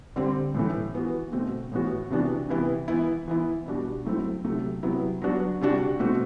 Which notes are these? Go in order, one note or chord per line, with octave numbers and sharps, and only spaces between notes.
D3 G3 C4
A2 E3 A3
E3 B3 F#4
B2 A3 C4 F#4
A2 E3 B3 F#4
C3 E3 B3 D4 F#4
C3 E3 B3 E4
E3 B3 E4
E3 B3 E4
B2 G3 D4 F#4
F#3 A3 C4 E4
C3 F#3 A3
C3 F#3 B3 E4
F#3 B3 D4 F#4
C3 G3 D4 F#4
B2 A3 C4 F#4